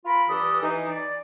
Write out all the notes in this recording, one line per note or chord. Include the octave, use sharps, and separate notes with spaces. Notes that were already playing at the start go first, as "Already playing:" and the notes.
F4 A#4 B5
G2 E3 D4 G4 A4 D#6
E3 D#4
D5